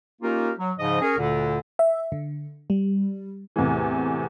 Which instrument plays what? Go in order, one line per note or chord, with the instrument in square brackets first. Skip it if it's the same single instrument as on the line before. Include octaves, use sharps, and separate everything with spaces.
[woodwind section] A#3 C#4 D#4 F4 G4 A#4
F#3
G#2 C#3 F3 D#5
C#4 G#4 A#4
D2 A#2 D3
[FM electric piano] E5
D3
G3
[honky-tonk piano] E2 A2 C3 E3